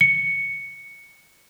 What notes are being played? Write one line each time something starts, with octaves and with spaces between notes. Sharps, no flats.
C#7